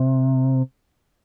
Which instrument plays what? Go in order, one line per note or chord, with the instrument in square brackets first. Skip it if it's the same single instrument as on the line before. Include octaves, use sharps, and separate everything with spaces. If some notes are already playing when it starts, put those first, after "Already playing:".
Already playing: [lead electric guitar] C3